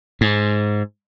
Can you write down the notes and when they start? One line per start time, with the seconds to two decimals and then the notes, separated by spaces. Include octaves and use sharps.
0.21 G#2